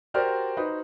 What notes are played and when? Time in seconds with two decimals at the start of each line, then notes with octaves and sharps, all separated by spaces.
0.14 F#4 G4 A#4 C5 D5 F6
0.57 D#4 F#4 B4 C5